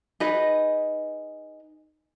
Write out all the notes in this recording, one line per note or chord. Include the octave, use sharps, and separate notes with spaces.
D#4 G#4 B4 D#5